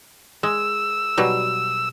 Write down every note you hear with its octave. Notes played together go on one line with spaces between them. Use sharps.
G#3 E6
B2 F#3 G3